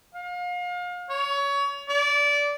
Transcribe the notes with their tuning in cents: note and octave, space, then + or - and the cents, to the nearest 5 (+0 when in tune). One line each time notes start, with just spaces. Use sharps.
F5 +35
C#5 +25
D5 -20